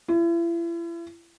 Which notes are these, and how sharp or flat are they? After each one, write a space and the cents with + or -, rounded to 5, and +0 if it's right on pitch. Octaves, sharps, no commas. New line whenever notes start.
E4 +40